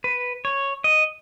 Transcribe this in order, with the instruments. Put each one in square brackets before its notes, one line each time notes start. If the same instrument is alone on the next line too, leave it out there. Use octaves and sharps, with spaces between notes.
[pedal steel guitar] B4
C#5
D#5